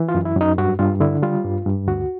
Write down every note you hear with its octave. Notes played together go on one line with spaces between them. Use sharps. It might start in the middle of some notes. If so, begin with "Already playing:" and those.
Already playing: E3
F4
F#2
E4
F#2 D#4
G2 F#4
G2 F4
D3 E4
G3 F4
G2
G2
D2 F#4